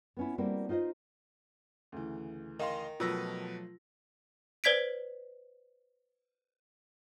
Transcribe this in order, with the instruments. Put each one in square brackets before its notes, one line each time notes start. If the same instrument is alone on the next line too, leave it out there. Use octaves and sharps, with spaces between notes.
[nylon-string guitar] B3 C#4 E4
G3 A3 A#3 C4 E4 F#4
D#4 F4 C5 D5 D#5
[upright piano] D2 C#3 E3
[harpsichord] D#3 [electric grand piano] D#5 F5 C6
[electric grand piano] B2 B4 A#6 [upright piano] F3 F#3 A3 [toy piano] F4 E6
[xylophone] B4 C5 D5 G#6 B6 D7